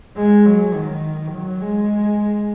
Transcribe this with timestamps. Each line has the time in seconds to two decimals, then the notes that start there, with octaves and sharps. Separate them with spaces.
0.17 G#3
0.46 F#3
0.74 D#3
1.32 F#3
1.61 G#3